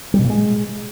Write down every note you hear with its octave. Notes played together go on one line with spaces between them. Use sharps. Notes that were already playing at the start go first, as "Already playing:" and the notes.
G3
B2
A#2
G#3